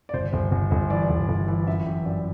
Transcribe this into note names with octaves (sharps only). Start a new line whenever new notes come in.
D5
G1 C5
G1
G1
G1
E3 D5
G1
G1
E3
F#2 E5
E3 G5
F#2 D5